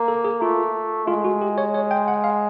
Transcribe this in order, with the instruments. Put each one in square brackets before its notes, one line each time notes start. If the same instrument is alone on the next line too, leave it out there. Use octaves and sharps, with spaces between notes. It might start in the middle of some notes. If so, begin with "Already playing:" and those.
Already playing: [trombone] A#3
[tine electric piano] A4
G#4
[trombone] A3 [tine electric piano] F4
[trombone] G#3 [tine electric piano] F4
[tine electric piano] F#4
G4
C#5
C#5
G5
F#5
F5